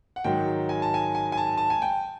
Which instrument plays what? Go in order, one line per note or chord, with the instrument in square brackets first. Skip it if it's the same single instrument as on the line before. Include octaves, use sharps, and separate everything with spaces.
[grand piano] F#5
G#2 D#3 F#3 G5
G#5
A5
G#5
G#5
G#5
A5
A5
G#5
G5